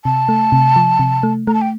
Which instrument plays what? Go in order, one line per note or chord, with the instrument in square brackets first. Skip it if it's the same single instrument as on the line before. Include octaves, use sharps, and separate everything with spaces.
[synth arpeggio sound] C3 [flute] A5
[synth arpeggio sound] A3
C3
F3
C3
A3
[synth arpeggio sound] A3 [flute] A#5
[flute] A5
G5